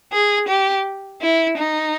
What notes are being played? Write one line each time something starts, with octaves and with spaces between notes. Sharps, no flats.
G#4
G4
E4
D#4